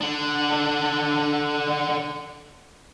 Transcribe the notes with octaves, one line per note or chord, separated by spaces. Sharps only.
D3 D4